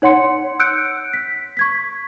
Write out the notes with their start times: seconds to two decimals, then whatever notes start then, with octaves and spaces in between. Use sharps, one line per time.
0.02 D#4 C#5 F#5 C6 C#7
0.60 E6 F#6 G6 C#7 D7
1.13 B6
1.57 C#6 G#6 B6